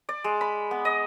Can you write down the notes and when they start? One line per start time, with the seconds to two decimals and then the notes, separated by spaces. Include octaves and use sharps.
0.09 D5
0.24 G#3
0.41 B5
0.71 B3
0.85 D#5